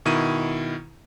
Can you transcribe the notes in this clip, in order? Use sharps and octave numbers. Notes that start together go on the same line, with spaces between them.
B2 D#3 E4 D#7